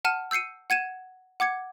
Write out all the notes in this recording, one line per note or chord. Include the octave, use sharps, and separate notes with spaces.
F#5 A5 F6 D#7
E6 G6 C7 C#7 D#7
F#5 G#6 D#7 E7
F#5 D6 G#6 C#7